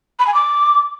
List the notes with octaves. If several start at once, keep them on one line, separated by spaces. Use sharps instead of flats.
B5
G#5
D6